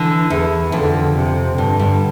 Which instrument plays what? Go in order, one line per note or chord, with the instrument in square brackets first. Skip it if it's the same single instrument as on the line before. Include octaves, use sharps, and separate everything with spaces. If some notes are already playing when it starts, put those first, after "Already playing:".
Already playing: [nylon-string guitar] D3 [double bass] E3
[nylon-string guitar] E2
[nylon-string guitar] F2 [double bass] D3
[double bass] C3
[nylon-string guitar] G2 [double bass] D3
[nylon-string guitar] G2